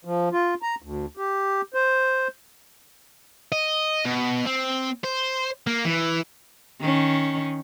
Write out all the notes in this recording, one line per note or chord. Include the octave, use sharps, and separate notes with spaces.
F3
F4
A#5
D2
G4
C5
D#5
B2
C4
C5
A#3
E3
D#3 C#4